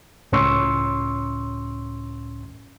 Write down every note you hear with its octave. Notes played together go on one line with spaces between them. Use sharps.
C#2 A2 C#4 C6 C#6 E6